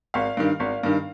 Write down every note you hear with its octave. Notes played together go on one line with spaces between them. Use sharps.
G#1 F5
G2 D#3
G#1
G2 D#3